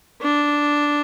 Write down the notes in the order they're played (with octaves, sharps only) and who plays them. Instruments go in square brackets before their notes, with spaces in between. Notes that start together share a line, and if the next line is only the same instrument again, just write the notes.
[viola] D4